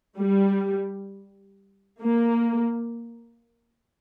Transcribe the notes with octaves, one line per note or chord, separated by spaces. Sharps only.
G3
A#3